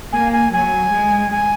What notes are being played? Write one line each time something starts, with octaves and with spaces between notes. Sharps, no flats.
A#3 G#5
G#5
F#3 G#5
G#3
G#5